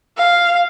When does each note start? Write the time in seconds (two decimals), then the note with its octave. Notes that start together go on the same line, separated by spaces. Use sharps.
0.17 F5